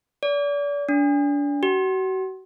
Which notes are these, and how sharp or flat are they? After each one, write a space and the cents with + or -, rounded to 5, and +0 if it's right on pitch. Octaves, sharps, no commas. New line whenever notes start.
D5 -35
D4 -30
F#4 +35